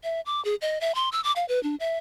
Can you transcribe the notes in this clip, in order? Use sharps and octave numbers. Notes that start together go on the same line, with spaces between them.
E5
D6
G#4
D#5
E5
C6
E6
D6
F5
B4
D4
E5